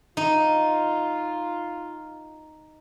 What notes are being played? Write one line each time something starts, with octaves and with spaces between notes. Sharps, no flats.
D#4 F4